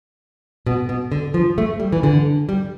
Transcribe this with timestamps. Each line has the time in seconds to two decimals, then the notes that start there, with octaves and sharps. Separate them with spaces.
0.66 B2
0.89 B2
1.12 D3
1.34 F3
1.58 A3
1.80 G3
1.92 E3
2.03 D3
2.49 G3